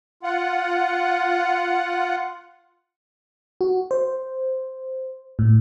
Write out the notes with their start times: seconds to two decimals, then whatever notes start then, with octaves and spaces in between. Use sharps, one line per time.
0.23 F4 F#5
3.61 F#4
3.91 C5
5.39 A2